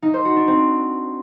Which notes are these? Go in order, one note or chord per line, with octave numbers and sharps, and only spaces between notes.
D#4
C5
F#4
D4
C4